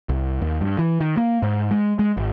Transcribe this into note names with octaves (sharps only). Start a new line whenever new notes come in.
C2
D#2
G2
E3
D#3
A#3
G#2
G#3
G#3
G#1